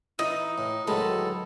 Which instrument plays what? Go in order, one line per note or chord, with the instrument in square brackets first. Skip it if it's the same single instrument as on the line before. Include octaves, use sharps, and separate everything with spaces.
[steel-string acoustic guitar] E3 [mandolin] D#4
[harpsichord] A2
[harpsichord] D2 D#3 F#3 [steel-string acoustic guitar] G#3 B4 [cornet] A4